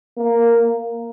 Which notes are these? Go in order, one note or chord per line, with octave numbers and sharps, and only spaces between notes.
A#3